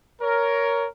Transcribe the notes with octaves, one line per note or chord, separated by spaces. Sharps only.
A#4 C#5